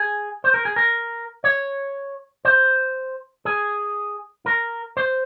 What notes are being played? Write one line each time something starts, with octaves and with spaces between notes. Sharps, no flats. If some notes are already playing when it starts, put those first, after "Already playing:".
Already playing: G#4
C5
A#4
G#4
A#4
C#5
C5
G#4
A#4
C5